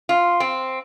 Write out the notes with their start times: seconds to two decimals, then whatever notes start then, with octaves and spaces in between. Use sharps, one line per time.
0.09 F4
0.40 C4